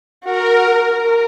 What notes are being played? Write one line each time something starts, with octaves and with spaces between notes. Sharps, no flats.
F#4 A#4
A#4